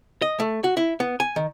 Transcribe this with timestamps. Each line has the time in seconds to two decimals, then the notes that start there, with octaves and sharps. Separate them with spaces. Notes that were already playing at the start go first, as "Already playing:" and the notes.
0.22 D#5
0.40 A3
0.64 F#4
0.77 E4
1.00 B3
1.20 G#5
1.36 D#3